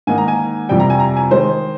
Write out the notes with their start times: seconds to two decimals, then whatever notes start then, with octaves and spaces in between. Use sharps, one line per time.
0.07 G#2 D#3 A#3 D#4 G#5
0.18 A#5
0.28 G#5
0.69 F2 C3 G3 G5
0.80 A#5
0.90 G#5
1.00 A#5
1.16 G#5
1.31 D#3 G#3 D#4 C5